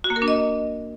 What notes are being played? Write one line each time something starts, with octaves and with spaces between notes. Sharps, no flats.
F#4
A#3
A#4
D4
D#5